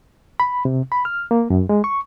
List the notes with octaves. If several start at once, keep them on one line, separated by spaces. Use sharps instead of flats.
B5
C3
B5
F6
A#3
F#2
G#3
C#6